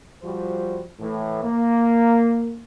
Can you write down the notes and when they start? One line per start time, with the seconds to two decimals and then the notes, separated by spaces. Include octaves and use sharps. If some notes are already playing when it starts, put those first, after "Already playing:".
0.23 F3 G3 F#4 C5
1.00 A2 E3
1.43 A#3